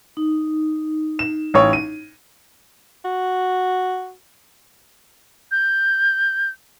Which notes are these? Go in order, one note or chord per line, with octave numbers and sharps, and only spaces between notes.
D#4
E7
A1 C#5
D#7
F#4
G6